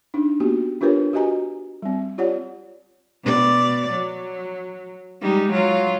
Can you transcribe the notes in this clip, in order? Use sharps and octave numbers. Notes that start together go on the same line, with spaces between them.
D4 D#4
A#3 B3 F#4 G4
D4 F4 G4 A#4 B4 C#5
F#4 G4 D#5 G#5 A#5
G3 C4
F4 G4 C#5 D5 F#5
B2 D5
F#3
G3 G#3 D#4
F#3 F4